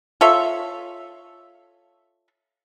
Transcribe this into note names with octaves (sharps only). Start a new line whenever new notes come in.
F4 A4 C#5 E5